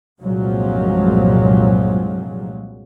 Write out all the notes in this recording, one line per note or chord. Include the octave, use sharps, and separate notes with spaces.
C2 G2 A#2 F3 F#3 G#3